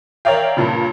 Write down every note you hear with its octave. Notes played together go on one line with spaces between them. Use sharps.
A#4 C#5 D5 E5 F5 G5
G2 A#2 C#3